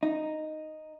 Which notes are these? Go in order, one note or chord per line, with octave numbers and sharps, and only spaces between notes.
D#4